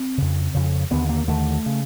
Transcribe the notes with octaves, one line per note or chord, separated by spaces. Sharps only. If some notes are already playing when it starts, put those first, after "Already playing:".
Already playing: C4
F2 C#3
F2 C#3
D#2 D3 B3
A#3
D#2 D3 A3
C#3